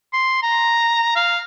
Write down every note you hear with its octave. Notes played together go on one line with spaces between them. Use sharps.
C6
A#5
F5